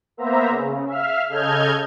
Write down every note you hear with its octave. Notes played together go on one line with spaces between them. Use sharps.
A#3 B3 C5 E5 A#5
C#3
E5 F5 F6
C#3 A4 D#5 F6 G6 G#6